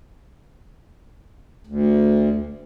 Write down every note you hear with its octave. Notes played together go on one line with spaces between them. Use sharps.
D2